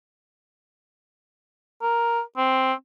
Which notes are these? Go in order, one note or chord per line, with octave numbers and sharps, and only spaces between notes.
A#4
C4